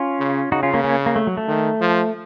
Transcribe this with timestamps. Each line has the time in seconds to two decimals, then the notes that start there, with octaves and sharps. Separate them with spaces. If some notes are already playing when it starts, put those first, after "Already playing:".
Already playing: C#4 F4
0.20 C#3
0.52 C#3 D#4 F#4
0.63 C#4 F4
0.74 A#3 C#4
0.84 A#3 C#4
1.06 A#3
1.16 A3
1.27 F#3
1.37 A3
1.48 D#3
1.81 F3